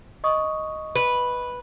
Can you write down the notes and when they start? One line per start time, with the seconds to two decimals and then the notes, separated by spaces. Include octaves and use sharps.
0.24 D#5 C#6 D#6
0.95 B4